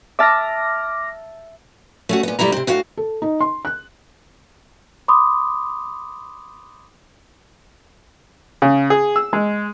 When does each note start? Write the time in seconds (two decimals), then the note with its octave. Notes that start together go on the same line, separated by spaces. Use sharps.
0.19 E5 A5 D6 F6 A#6
2.09 A3 C#4 F#4
2.23 A#2 B3
2.39 B2 G3 A3 E4 A#5
2.52 C3 C4
2.67 D2 A2 F#4 F5
2.97 A4
3.22 D#4
3.41 C6
3.65 F#6
5.08 B5 C6 D6 D#6
8.62 C#3
8.90 G#4
9.16 E6
9.33 G#3